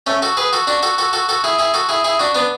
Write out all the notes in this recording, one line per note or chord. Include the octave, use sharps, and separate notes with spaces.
A3 C#4
F#4 A4
G#4 B4
F#4 A4
D4 F#4
F#4 A4
F#4 A4
F#4 A4
F#4 A4
E4 G#4
E4 G#4
F#4 A4
E4 G#4
E4 G#4
D4 F#4
B3 D4